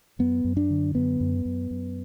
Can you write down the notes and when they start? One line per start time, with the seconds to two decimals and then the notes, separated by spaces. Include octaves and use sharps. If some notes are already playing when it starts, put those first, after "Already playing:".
0.19 F#2 B3
0.45 F#2
0.57 D4
0.70 D3
0.95 F#2 B3
1.20 F#2
1.45 F#2
1.71 F#2